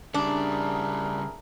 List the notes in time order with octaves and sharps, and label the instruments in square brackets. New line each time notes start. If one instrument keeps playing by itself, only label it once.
[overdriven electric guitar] C#3 G3 [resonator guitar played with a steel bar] D4 [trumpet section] E4 G#4 A#4